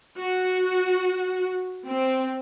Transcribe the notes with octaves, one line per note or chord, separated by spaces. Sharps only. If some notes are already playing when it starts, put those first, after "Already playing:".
F#4
C4